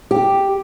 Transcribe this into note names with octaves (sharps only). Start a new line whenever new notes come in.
G4